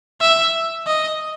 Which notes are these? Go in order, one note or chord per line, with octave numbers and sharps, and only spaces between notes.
E5
D#5